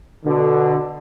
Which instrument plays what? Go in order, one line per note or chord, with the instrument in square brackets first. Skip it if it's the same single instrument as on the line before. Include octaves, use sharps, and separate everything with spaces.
[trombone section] B2 D3